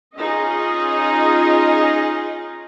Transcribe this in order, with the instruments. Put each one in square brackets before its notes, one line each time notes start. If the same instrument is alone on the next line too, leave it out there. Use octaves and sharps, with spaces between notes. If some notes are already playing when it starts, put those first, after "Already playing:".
[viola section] C#4 D#4 F4 G#4 D#5